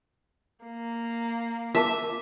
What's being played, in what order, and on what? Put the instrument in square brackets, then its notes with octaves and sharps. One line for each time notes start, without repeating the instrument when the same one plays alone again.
[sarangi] A#3
[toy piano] A#4 A5 D6 [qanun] E5